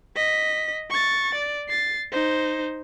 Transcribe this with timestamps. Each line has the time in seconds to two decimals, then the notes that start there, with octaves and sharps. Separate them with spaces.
0.16 D#5 B6
0.90 C#6 A6
1.35 D5
1.69 A6 C7
2.12 D#4 C5